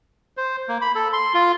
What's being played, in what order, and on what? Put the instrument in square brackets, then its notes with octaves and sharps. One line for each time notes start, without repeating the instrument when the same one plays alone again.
[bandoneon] C5
A#3
B5
A4
C6
F4